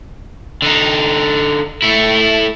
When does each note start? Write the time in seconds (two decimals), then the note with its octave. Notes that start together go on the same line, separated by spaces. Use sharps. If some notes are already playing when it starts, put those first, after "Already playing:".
0.62 D3 D#4
1.82 A3 E4